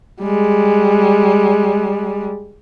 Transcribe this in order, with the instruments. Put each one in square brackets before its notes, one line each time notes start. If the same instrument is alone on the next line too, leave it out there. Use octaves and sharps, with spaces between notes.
[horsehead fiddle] G3 G#3